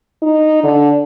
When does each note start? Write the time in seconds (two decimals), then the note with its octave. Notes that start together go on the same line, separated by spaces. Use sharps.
0.22 D#4
0.64 D3